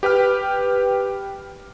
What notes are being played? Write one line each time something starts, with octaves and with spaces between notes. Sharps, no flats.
G4 B4 G5 F6